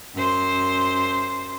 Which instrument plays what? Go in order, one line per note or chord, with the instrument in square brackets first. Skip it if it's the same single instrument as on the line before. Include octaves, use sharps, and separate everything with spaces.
[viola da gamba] F#2 C5